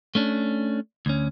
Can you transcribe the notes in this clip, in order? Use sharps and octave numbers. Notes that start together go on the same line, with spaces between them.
A3 C#4 D4
D2 C#4